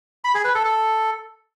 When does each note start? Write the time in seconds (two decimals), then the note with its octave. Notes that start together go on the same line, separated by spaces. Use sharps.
0.24 B5
0.34 G#4
0.45 B4
0.55 A4
0.65 A4